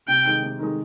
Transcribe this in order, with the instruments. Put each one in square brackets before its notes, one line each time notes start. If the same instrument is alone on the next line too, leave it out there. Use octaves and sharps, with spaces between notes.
[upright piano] C3 [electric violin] G5
[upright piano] D#3 G#3
C3
D#3 G#3